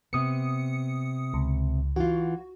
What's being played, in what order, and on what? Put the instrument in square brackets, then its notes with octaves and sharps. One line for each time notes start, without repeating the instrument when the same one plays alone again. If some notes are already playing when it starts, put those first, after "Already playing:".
[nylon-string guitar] C3 B3 [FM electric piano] D#6 C#7
[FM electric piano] C#2
[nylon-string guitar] E3 F4 [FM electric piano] F#4